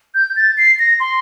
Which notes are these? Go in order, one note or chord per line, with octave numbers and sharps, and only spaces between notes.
G6
A6
C7
A#6
C6